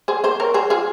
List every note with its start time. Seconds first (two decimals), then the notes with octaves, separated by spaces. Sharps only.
0.08 G#4 C5
0.24 G#4 C5
0.40 A#4 C#5
0.54 G#4 C5
0.70 F4 G#4